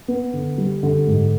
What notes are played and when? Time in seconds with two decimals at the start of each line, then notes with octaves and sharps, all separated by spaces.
0.08 B3
0.33 D3
0.58 G3
0.83 D3
1.07 G#2